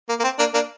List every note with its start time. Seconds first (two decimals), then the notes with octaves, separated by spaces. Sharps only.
0.09 A#3
0.20 A#3
0.24 C4
0.38 A#3 D4
0.54 A#3 D4